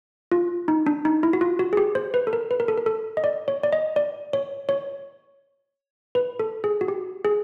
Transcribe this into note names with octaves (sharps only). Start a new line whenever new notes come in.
F4
D#4
D4
D#4
E4
F#4
F4
F#4
G#4
G4
C5
B4
A4
A#4
B4
A#4
A4
A#4
A4
D#5
D5
C#5
D5
D#5
D5
C#5
C#5
B4
A4
G#4
F#4
G4
G#4